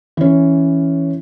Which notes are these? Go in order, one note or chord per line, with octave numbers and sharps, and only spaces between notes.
E3 C#4